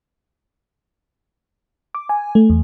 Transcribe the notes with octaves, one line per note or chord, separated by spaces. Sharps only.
D6
G#5
A3
E2